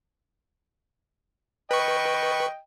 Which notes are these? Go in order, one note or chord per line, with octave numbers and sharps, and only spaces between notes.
B4 D#5 G5 C#6